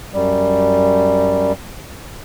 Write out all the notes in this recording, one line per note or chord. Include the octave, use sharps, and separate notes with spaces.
F#2 G3